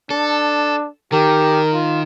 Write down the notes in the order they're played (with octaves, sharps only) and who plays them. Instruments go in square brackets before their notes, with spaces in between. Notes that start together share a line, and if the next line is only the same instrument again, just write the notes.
[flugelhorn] D4 [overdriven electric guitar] A4
[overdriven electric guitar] D#3 [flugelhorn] G4 [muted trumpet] A#4
[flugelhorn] F4